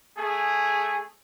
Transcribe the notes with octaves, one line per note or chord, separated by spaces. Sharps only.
A3 G#4